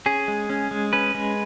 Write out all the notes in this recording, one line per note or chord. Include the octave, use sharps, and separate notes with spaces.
C#4 G#4
G#3
C#4
G#3
C#4 B4
G#3